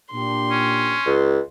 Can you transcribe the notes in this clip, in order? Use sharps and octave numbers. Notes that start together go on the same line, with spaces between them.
A#2 D4 G4 C6
C#4
C#2